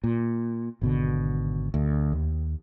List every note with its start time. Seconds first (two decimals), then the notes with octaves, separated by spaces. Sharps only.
0.04 A#2
0.82 G#1 B2 D3
1.74 D2
2.12 D#2